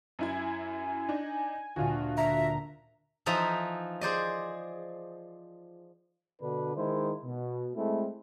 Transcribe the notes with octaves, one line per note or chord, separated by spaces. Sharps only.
F#2 E4 G#5 G#6
D4 D#4
D2 A#2 F4 F#4
E5 A#5
E3 F3 D#4 F4 D#5 E5
G#4 C5 D5 D#5
B2 D3 D4 B4
D#3 G#3 E4 C5
B2
G#3 A3 C4 E4